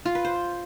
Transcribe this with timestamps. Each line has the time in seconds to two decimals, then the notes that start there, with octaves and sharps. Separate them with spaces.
0.06 F4
0.15 B4
0.25 C5